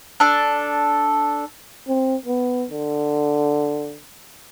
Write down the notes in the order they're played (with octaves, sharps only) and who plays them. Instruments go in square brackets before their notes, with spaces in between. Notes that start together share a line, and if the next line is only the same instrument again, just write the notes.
[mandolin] D4 A4
[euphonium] C4
B3
D3